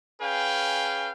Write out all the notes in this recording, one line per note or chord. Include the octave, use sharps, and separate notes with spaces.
C#4 G#4 B4 F5 G5